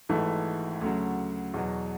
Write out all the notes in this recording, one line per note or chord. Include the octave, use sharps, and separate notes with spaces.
G#1 G#2 E3 A3 A4
D2 C#3 F#3
E2 B2 F#3